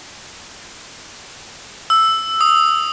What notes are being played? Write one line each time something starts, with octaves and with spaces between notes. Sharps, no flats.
E6
D#6